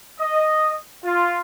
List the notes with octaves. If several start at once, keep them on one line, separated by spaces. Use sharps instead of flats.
D#5
F4